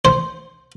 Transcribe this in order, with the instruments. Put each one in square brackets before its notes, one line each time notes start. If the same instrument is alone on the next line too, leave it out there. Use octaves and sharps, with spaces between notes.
[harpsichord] C5